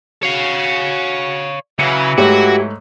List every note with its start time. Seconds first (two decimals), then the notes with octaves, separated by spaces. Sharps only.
0.23 F#4 C#5 F5
1.79 C#3 E3 F#3 C#7
2.18 G#2 A3 F#4 G4 C#5